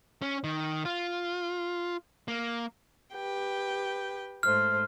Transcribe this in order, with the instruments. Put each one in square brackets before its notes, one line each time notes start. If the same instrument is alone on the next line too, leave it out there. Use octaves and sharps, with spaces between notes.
[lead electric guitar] C#4
D#3
F4
A#3
[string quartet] G4 B4 G5
[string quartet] G#2 A3 C5 [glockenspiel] F6